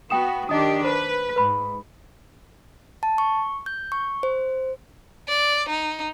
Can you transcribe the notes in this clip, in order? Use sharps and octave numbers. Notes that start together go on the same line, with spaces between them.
B3 F#4 G5 D#6 E7
D#3 D4 G4 D#5 D#6
B4 C5
G#2 B4 B5
A5
C#6
G6
C#6
C5
D5
D#4